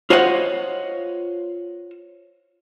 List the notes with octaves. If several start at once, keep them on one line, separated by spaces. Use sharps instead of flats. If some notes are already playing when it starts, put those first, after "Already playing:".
F4 C5 C#5 D#5 F5 F#5